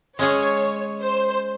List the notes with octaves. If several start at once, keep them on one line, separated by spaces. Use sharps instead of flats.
G#3 C#4 G#4 C#5
C5